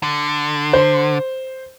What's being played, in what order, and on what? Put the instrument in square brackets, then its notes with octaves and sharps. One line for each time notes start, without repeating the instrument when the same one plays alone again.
[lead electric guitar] D3
[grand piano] C5